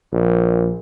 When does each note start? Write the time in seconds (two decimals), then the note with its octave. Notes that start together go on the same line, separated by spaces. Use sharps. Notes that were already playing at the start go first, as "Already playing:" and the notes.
0.13 A#1